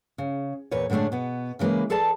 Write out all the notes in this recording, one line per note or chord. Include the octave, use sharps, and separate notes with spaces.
C#3
E2 A#2 B4 C#5
A2 D3 G#3 A3 D4
B2 B3
C#3 E3 G#3 A#3 B4
G#4 A4 B4 D5 A5